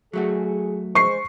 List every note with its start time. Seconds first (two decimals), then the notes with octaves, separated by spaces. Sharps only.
0.13 F#3 A3 F#4 G#4
0.95 G#3 C5 C#6 C7